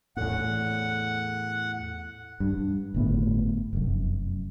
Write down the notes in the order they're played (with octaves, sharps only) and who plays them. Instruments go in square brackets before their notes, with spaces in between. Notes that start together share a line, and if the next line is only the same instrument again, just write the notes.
[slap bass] E2 A2 [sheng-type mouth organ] F#5
[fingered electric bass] G2
G1 A2 B3
F1 F#2